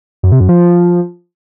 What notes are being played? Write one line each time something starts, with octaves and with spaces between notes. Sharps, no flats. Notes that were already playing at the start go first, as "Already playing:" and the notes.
F#2
C3
F#2
F3